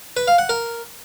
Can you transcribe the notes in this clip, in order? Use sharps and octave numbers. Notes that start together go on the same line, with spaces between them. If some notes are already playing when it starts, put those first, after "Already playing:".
B4
F5
F#5
A#4